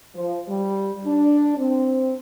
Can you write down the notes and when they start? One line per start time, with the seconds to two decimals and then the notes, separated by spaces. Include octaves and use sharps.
0.14 F3
0.49 G3
1.05 D4
1.57 C4